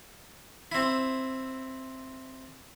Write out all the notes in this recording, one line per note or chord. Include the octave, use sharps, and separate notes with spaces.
C4 E4